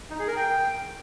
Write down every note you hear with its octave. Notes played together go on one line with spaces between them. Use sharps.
D#4
G#4
A#4
G5